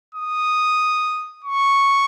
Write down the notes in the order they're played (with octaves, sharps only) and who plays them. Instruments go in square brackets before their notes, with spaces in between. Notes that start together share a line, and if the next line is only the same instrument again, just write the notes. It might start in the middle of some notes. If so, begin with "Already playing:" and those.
[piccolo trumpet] D#6
C#6